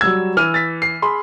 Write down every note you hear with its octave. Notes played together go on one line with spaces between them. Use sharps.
F#3 G3 E6 G#6
E3 F6 D#7
A6 B6
C7
G#4 B5 C6